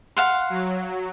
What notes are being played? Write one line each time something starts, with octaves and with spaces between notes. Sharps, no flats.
F5 F#5 C6
F#3